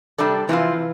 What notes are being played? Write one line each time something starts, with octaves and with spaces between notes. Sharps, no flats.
C3 G3 D4 A4 D5
C3 E3 F3 C4 F4